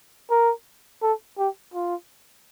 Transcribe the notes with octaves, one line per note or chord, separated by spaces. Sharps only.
A#4
A4
G4
F4